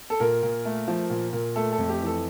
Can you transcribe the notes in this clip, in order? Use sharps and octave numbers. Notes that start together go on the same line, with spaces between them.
A4
A#2 A#4
A#2
A3
F3
A#2
A#2
A3 A4
A4
F2
G4
E3
A4